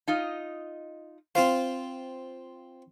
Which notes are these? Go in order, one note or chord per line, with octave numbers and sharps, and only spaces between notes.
D#4 F4 D#5
C4 F4 C5 F5